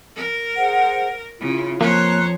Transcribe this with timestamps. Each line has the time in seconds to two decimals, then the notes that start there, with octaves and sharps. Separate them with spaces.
0.16 A#4
0.55 G#4 C5 F#5
1.40 C#3 E4 F4
1.81 F2 F3 A#3 C5 C#5 A#5 F#6